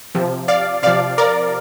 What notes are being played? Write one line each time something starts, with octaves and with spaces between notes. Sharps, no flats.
C3 F3
D5 F5
C3 F3 D5 F5
A#4 D5